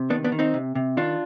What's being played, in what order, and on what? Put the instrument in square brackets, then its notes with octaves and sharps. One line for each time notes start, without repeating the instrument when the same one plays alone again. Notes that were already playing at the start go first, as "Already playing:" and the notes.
Already playing: [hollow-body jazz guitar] C3
D#3 B3 D4
B3 D4
D#3
C4 D#4
C3
C3
D#3 D4 F4